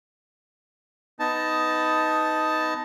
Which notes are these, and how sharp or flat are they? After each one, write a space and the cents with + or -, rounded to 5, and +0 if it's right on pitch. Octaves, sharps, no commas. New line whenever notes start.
B3 +20 D#4 +10 A5 +0